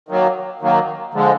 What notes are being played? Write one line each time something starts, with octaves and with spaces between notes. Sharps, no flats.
D#3 F#3 A#3
D#3 F#3 A#3
D3 F3 G#3